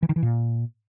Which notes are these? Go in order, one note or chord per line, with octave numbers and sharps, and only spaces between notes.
E3
D#3
E3
A#2